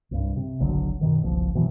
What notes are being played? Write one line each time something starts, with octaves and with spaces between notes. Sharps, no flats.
C2 G2
C3
F#1 B1 D3 F#3
F#2 B2 D#3
F#1 C2 F3
F#2 B2 E3 F#3